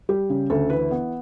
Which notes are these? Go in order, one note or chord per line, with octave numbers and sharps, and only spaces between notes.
G3 G4
C#3
D2 A4
E3 B4
B3